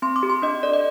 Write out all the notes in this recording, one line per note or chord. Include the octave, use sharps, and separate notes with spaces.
C4 C6
D6
G4
C6
D4 D#5
A4 D5
D#5